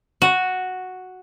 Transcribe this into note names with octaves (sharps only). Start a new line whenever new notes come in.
F#4